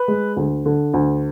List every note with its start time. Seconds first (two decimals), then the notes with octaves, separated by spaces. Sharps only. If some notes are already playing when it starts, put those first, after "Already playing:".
Already playing: B4
0.08 G#3
0.36 D2
0.66 D3
0.94 D2